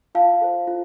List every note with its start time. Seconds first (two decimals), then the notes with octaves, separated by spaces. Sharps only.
0.15 F4 F5 A5
0.41 A4 C5
0.67 F4